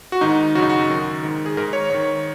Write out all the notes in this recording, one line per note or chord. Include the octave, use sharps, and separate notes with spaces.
F#4
G#2 D#3 D#4
F#2 C#3 D#4 F#4
F#4
F#2 D#3
G#2 D#3
G#4
G#2 D#3 A#4
C#5
G#2 D#3 C#5